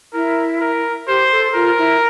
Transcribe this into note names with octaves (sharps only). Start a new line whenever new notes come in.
E4 A#4
A#4
G4 C5
A4
F4 A#4
E4